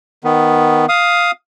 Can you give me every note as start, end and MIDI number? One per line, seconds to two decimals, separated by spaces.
0.24 0.86 51
0.24 0.86 59
0.89 1.31 77
0.89 1.31 87